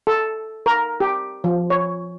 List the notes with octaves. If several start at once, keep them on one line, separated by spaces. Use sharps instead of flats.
A4
A#4
G4
F3
C#5